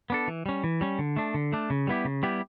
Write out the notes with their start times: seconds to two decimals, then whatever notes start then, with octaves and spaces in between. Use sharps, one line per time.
0.10 B3 D4 A4
0.28 E3
0.46 G3 C#4
0.64 E3
0.81 G3 C#4
0.99 D3
1.17 A3 D4
1.34 D3
1.52 A3 D4
1.70 C#3
1.87 G3 B3 E4 G4
2.05 C#3
2.23 G3 B3 E4 G4